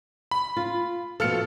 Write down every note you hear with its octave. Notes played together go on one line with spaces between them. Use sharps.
B5
F4
B2 F3 A4 F6 C#7